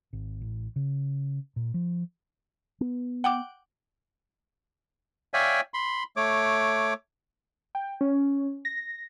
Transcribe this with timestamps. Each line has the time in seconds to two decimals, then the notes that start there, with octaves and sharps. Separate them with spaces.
0.13 G#1
0.41 A1
0.76 C#3
1.56 A#2
1.74 F3
2.81 B3
3.24 F#5 G5 D6
5.34 C#5 D5 E5 F5 G5 G#5
5.74 B5 C6
6.16 A3 C#5 D6
7.75 G5
8.01 C#4
8.65 A#6